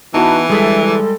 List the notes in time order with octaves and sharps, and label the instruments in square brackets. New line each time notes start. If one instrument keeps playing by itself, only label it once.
[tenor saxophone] E3 [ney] B3 [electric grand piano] D#4 E4 F#4 [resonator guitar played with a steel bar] A5
[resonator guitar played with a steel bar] D3 G#4 E5 [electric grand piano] G3 G#3 [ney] A4